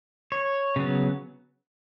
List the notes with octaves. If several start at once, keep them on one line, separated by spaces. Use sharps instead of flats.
C#5
C#3 F#3 B3